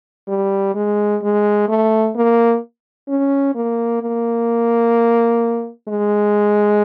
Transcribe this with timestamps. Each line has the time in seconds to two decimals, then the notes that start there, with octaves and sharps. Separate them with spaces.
0.28 G3
0.75 G#3
1.23 G#3
1.69 A3
2.16 A#3
3.08 C#4
3.55 A#3
4.02 A#3
5.88 G#3